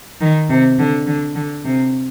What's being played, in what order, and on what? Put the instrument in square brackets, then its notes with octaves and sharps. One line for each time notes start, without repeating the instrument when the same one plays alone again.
[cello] D#3
C3
D3
D3
D3
C3